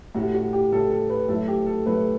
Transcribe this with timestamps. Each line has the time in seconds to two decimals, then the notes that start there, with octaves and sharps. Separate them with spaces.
0.15 A2 G3 F#4
0.34 F#4
0.53 G4
0.72 A2 G3 A4
0.90 A4
1.10 B4
1.28 A2 F#3 A3 A4
1.48 G4
1.66 A4
1.86 A2 F#3 A3 B4